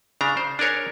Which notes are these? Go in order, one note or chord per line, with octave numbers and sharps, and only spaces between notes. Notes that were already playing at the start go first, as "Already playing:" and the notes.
C#3 D4 A#5
C5
D4 G#4 A#4 C#5